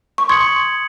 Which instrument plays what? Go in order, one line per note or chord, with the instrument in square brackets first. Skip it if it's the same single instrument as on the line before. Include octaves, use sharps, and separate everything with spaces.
[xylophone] C#6
[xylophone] C6 [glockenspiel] D#6 G#6 C#7 F#7